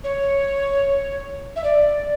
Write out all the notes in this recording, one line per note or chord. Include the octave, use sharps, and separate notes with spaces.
C#5
E5
D5